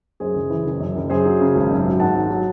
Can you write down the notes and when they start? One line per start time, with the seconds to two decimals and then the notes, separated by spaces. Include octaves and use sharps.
0.20 F#2 G#4 C5
0.35 F#1
0.50 E3
0.65 F#1
0.80 F#2
0.96 F#1
1.10 F#2 G#4 C5
1.26 F#3
1.40 C#3
1.55 G#1
1.70 F#2
1.85 F#3
2.00 G#2 F#5 A5
2.15 G#1
2.30 F#3